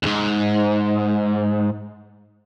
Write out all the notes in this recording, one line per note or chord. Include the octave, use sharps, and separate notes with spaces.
D2 G#2